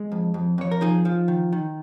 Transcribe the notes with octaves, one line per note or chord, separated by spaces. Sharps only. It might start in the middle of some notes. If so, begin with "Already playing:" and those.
Already playing: G#3
F2
F2
F2 C#5
A#4
F3 D#4 G#4
F3
D#3
D#3